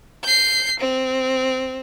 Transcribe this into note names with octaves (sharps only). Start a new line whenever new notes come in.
G6 C7
C4